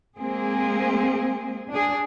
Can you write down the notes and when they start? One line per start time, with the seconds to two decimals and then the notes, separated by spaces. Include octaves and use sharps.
0.17 G#3 A#3 C4 G#4
1.69 D4 G#4